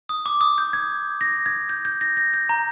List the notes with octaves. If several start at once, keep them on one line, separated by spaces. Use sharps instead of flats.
D#6
D6
D#6
G6
G#6
A#6
G#6
G6
G6
A#6
A#6
G6
A#5